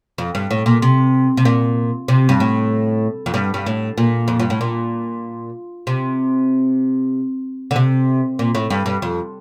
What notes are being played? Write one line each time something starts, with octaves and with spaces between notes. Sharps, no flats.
F2
G2
A2
A#2
C3
C3
A#2
C3
G2
A2
F2
G2
G2
A2
A#2
F2
G2
A2
A#2
C3
D3
C3
A#2
A2
G2
G2
F2